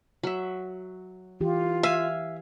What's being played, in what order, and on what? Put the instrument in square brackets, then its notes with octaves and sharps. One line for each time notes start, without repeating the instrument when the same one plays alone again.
[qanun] F#3 E5
[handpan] E3 G4 [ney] F4
[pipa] E5 [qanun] F5 G#5